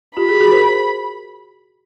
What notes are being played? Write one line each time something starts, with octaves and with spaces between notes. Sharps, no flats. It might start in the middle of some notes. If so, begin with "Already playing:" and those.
F4 G4 B5
F#4 G#4
F#4 G#4
A#4 C5